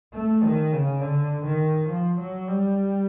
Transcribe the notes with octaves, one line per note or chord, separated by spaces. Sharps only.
A3
D#3
C#3
D3
D#3
F3
F#3
G3